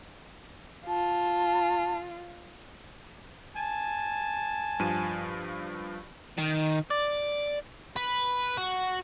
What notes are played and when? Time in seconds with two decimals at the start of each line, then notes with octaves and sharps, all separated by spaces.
0.88 F4 A5
3.56 G#5 A5
4.80 G2 F3 D#7
6.38 D#3
6.90 D5
7.97 B4
8.57 F#4